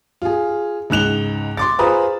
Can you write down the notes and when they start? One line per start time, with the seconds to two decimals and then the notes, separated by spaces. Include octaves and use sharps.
0.22 F4 G#4
0.90 C#2 G#2 F#6 F7 G7
1.57 C6 D6 A6
1.79 F4 G#4 B4 C5 A#5 D#6